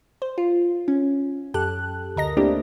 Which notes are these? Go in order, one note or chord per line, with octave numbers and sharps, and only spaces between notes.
C5
F4
C#4
F#2 G4 A4 F#6
D2 A#4 D#5 A#6
A3 A#3 C4 D4 E4 G4